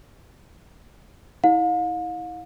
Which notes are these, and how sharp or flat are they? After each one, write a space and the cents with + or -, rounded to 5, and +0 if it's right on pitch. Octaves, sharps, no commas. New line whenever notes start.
E4 -35 F5 +40